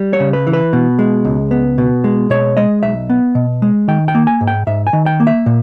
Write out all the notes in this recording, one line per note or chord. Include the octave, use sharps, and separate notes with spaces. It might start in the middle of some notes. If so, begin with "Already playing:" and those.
Already playing: G3
C#5
C#3
B4
E3
B4
B2
G#3
C#2
B3
B2
G#3
B2 C#5
G#3 D#5
B1 E5
B3
B2
G#3
D#3 G5
G5
A#3
G#5
G#2
G5
G#2 E5
G#5
D#3
G5
A#3
E5
A#2